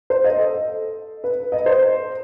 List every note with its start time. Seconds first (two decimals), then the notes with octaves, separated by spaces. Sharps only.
0.10 C5
0.24 D#5
0.39 A4
1.24 B4
1.52 D#5
1.66 C5